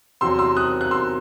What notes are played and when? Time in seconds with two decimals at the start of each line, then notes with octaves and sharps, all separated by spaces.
0.21 E2 C3 F#3 C4 C6 E6
0.39 C6 E6
0.56 D#6 F#6
0.81 F#6
0.91 C6 E6